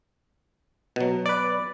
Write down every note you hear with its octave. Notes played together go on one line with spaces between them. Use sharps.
B2 F#3
B4 D5